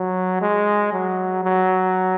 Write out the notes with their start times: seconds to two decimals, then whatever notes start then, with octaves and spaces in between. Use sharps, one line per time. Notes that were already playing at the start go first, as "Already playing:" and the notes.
Already playing: F#3
0.42 G#3
0.92 F#3
1.44 F#3